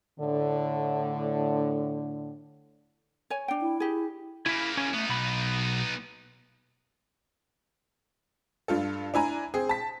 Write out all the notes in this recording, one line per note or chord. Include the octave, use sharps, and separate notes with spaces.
A2 D3
C#5 G#5
D4 G5
E4
G4 G#4
C#3 A#3 E4 B5
C#4 G#5
A3 B3 D#4
B1 B5
G2 F4 A4
D4 E4 G#5 A#5
C4 G#4
A5 B6